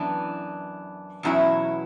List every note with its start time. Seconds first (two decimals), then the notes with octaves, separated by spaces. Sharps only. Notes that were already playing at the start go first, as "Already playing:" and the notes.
Already playing: F#2 E3 B3 D4
1.23 E2 B2 F#3 C#4 E4